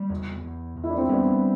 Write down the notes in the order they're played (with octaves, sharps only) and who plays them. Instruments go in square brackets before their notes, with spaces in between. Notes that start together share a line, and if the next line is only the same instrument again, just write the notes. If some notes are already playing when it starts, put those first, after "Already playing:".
Already playing: [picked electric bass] G3
E2
E2
E2
[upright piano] E4
D4
C4 E4
[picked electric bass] G3 [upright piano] B3 D4